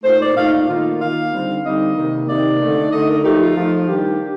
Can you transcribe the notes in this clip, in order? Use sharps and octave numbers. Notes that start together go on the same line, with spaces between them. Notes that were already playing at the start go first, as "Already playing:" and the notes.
A#2 A3 D#4 C5
D5
A#2 A3 D#4 F5
D#3 A#3 F4
D#3 A#3 F4 F5
D3 G3 C4 D#4
D3 G3 C4 D#4 D#5
C3 D#3 A#3 D#4
C3 D#3 A#3 D#4 D5
D3 A3 D#4
D3 A3 D#4 D#5
A#4
F3 A3 D#4 G4
G4
F4
F3 A3 D#4
D#3 G3 D4 G4
D4